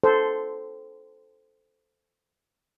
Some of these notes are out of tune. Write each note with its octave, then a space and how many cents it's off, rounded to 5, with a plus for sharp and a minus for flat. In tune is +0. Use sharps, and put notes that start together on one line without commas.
A4 -5 C5 -10